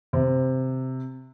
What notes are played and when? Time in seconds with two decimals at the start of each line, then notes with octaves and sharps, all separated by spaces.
0.13 C3